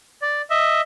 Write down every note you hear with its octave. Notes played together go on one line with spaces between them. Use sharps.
D5
D#5 E5